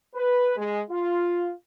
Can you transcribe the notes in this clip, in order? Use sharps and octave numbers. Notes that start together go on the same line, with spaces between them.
B4
G#3
F4